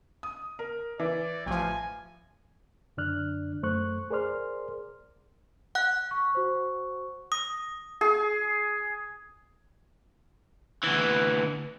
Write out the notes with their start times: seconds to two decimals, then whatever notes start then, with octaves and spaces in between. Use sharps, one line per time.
0.23 D#6
0.59 A#4
0.99 E3 D5
1.46 A1 F3 G#5
2.97 F#2 D3 D4 D5 F6 F#6
3.63 F#2 A3 C5 C#6 F#6
4.10 G#4 A#4 C5 D5 C6 F6
5.75 F#5 F#6
6.11 C#6
6.33 F#4 C5 C#6
7.32 D#6 A#6
8.01 G#4
10.83 D2 E3